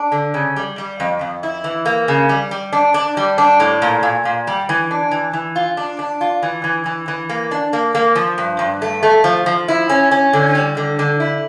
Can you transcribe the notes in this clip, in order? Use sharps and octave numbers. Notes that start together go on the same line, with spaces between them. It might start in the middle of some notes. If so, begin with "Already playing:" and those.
Already playing: D4
D3
C#3
G3
G3
F2
F2
E4
E3
A#3
C#3
G3
G3
D4
D4
G3
D4
A2
A#2
A#2
A#2
G3
E3
D4
E3
E3
F4
D4
D4
F4
E3
E3
E3
E3
A#3
D4
A#3
A#3
F3
G2
G2
A3
A3
F3
F3
E4
C#4
C#4
D3
G3
D3
D3
E4